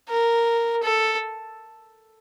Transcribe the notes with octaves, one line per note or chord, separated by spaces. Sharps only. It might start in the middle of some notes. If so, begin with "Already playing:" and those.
A#4
A4